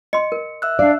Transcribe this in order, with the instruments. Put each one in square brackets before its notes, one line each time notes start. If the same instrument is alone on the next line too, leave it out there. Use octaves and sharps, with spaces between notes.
[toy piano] D#5 C6 [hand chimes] C#7
[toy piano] A#4
[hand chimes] E5 E6 F#6
[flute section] D4 F5 [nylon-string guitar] D5